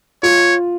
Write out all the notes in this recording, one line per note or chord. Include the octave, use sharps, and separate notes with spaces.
F4 C#5